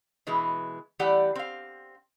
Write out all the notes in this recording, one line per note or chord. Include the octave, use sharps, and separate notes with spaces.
B2 E3 G#3
E3 G3 A3 G4 D5 F#5
C4 F5